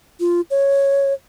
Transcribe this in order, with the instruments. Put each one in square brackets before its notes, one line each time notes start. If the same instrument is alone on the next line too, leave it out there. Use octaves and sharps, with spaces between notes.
[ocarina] F4
C#5